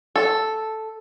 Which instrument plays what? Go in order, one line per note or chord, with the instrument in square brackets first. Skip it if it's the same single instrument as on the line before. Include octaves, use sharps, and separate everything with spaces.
[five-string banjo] A4